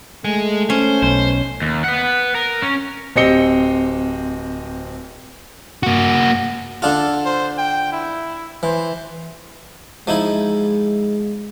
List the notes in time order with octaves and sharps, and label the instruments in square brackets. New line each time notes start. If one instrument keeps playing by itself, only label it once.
[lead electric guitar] G#3 [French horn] A3
[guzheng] C#4 [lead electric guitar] C5
[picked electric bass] B1 [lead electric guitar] C5
[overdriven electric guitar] D#2
B4 F#5
A#4
C#4
[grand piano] D1 C4 G4 D#5 C#7 G7
[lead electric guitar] A#3 F#4
[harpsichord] D3 D4 F4 [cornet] A4
[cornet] C5
G5
E4
[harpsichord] E3 [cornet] C5
[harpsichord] F3 D#4 E4 [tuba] G#3